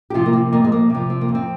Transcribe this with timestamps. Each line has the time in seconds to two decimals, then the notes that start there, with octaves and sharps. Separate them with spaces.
0.10 G4
0.14 C3 F3 F4
0.26 A#3
0.33 C4
0.52 F2 A#3
0.64 G#3
0.72 A#3
0.90 C3 F3
1.10 C4
1.21 A#3
1.28 F2
1.35 C4